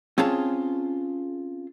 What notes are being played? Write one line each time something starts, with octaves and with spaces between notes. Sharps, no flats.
C4 C#4 F4 G#4 A5